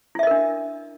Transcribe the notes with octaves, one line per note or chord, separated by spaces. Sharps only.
D4 E4 A#4 D#5 E5